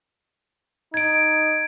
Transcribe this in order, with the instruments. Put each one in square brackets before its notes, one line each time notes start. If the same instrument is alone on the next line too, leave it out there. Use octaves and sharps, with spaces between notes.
[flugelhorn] D#4 [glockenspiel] G#6 D7